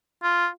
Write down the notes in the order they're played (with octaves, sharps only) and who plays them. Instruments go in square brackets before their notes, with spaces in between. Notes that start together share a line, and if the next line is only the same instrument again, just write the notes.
[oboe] F4